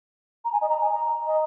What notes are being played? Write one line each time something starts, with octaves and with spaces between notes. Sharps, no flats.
A#5
G#5
D#5
A#5
G#5
A#5
D#5